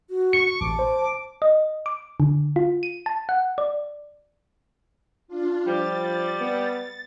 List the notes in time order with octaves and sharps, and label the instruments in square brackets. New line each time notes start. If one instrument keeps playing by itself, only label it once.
[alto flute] F#4
[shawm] C#6 [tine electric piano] C#7
[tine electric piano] A1 [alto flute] A5 [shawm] D6
[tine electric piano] C5
[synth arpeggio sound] D#5
D6
D3
F4
D#7
A5
F#5
D5
[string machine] D4 F4
[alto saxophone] F3 [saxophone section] G3 [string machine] A6
[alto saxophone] B3